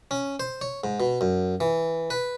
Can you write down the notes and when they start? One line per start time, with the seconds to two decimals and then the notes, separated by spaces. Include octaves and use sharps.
0.11 C#4
0.40 C5
0.61 C#5
0.84 G#2
1.00 B2
1.21 F#2
1.60 E3
2.10 B4